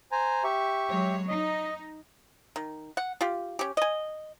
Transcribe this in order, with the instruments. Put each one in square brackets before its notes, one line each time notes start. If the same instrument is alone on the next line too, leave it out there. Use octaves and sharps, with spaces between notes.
[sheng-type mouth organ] C5 G#5 A#5
G4 E5 C#6
[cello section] F#3 G#3 C#5
[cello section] D#4 [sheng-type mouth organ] D#5
[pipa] D#3
F#5
F4 G4
C#4 G4
D#5 G#5